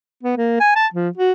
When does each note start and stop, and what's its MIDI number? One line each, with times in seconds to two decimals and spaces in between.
0.23 0.37 59
0.37 0.55 58
0.60 0.71 80
0.76 0.87 81
0.94 1.09 53
1.17 1.32 66